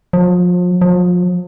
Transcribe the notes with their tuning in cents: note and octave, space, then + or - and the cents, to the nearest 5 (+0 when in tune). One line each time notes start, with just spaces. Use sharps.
F3 +35
F3 +35